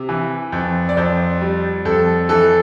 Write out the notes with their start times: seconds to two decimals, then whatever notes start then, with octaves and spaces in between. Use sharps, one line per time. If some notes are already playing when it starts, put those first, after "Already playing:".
Already playing: C3
0.09 E3
0.52 F2
0.89 D5
0.97 F2 C5
1.41 G3
1.85 F2 A4
2.29 E3 A4